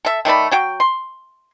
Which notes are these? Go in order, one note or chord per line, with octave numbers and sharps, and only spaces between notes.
A4 E5
D#3 A3 D5 B5
F#3 F#4 G5
C6